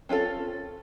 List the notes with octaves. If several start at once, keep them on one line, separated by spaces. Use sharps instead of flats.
C4 C#4 F4 A4